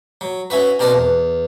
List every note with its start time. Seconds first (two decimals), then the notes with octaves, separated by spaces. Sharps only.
0.21 F#3
0.50 C#4 E4 F#4 B4
0.79 B2 C4 A#4 D5 A5
0.94 E2